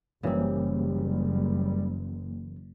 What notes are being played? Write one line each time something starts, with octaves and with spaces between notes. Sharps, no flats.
F#1 F#2 C#3 E3 G3 A#3 C4